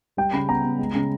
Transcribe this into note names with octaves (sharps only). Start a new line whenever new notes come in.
G3 G5
C#3 B5
B3 A#5
B3
G#3
C#3